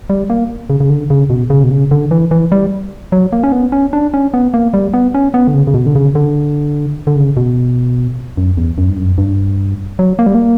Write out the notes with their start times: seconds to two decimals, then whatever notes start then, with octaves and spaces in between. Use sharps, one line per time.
0.10 G3
0.30 A#3
0.70 C#3
0.80 C#3
0.90 D3
1.10 C#3
1.30 B2
1.50 C#3
1.64 B2
1.71 C#3
1.91 D3
2.11 E3
2.31 E3
2.52 G3
3.12 F#3
3.32 A#3
3.43 C#4
3.52 B3
3.72 C#4
3.93 D4
4.14 C#4
4.34 B3
4.54 A#3
4.74 G3
4.94 B3
5.14 C#4
5.34 B3
5.48 D3
5.54 C#3
5.67 C#3
5.74 B2
5.86 D3
5.95 C#3
6.15 D3
7.07 D3
7.16 C#3
7.37 B2
8.37 F#2
8.57 E2
8.78 F#2
8.89 G2
8.98 F#2
9.18 G2
9.99 F#3
10.19 A#3
10.26 G3
10.35 A#3